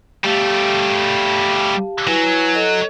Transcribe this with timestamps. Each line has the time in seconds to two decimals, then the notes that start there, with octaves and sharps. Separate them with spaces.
0.24 G3 A3 G4 F5 A5
2.07 F#3 E4 B4 G#5
2.55 A4 D#5